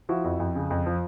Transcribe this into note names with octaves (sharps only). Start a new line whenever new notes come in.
F3 E4 F#4
F2
F2
C#3
F2
F3